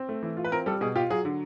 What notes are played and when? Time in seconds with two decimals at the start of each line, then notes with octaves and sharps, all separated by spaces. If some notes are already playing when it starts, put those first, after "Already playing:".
Already playing: C4
0.09 A3
0.23 E3
0.37 F4
0.44 B4
0.52 C4 A#4
0.66 G3 A4
0.81 B2 G#4
0.95 F4 G4
1.10 F#3 G#4
1.25 D3